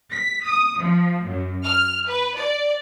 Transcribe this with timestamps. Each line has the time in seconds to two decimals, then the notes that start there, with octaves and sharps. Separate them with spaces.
0.13 B6
0.44 D#6
0.78 F3
1.25 F#2
1.64 F6
2.09 B4
2.38 D5